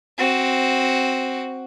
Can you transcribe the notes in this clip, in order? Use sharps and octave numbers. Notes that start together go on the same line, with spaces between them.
C4 F#4